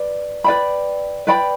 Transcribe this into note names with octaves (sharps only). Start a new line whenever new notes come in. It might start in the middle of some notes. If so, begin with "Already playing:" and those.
Already playing: B4 D5
B4 D5 G5 B5
B4 D5 G5 B5